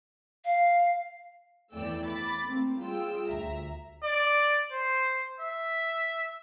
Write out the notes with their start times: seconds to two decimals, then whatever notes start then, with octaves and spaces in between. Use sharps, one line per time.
0.45 F5
1.73 E2 E3 A3 D5 G5 E6
2.07 B5 D6 A6
2.46 A3 A#3 C4
2.81 G3 F4 G#4 G5 E6
3.26 D2 E5 A#5
4.03 D5
4.72 C5
5.40 E5